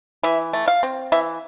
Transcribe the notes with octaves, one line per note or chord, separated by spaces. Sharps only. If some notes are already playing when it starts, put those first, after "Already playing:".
E3 E5
A3
F5
C4
E3 E5